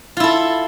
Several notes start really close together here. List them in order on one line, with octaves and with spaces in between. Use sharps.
F4 E4 A4